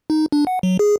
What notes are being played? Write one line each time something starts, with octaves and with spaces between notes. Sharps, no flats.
D#4
D4
F#5
F#3
G#4